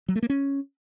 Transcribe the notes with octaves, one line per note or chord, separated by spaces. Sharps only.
F#3
A3
A#3
C#4